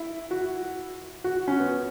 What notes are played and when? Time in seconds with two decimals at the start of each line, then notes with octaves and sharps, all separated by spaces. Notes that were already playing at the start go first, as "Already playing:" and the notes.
Already playing: E4
0.31 F#4
1.24 F#4
1.48 C#4
1.60 B3